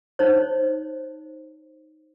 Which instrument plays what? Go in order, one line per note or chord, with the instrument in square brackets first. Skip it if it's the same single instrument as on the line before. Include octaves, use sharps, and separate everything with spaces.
[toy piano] D#4 C5 C#5